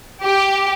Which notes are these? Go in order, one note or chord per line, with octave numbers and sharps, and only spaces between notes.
G4